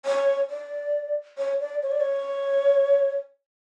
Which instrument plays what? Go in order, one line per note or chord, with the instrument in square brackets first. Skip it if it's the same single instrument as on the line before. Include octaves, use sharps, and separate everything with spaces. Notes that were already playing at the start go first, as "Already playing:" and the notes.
[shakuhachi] C#5
D5
C#5
D5
C#5
D5
C#5